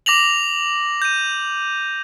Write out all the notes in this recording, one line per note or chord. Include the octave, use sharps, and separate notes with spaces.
D6 A#6 F7 F#7
G6 D#7